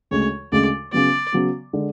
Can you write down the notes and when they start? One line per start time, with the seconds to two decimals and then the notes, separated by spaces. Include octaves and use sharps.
0.11 D2 C#3 G#3 C#5
0.52 D2 C#3 G#3 D5
0.92 C#3 F#3 B3 D5
1.33 C#3 F#3 B3
1.73 D3 G#3